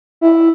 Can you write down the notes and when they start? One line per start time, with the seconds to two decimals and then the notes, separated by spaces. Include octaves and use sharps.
0.21 E4